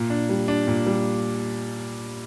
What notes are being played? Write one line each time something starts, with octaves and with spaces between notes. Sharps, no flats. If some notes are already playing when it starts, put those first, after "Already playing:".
Already playing: A#2
D4
G3
D4
A#2
G3